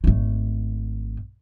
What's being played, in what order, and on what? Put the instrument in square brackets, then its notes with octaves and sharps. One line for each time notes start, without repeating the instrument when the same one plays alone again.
[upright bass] G#1 A3